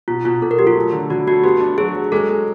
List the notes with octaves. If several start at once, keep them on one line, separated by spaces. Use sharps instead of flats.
B2 F4
B2 F4
B2 A4
A#4
F#3 G4
F4
A3
D3
D3 F#4
A3 F#4
B3 G4
D4
F#3 G#4
F#3
G#3 A4
G#3